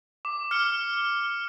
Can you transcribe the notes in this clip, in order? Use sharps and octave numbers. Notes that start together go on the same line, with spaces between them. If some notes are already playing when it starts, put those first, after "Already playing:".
D6
F6 C#7 G7